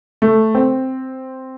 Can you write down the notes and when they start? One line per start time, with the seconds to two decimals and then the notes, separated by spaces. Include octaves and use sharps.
0.22 A3
0.55 C4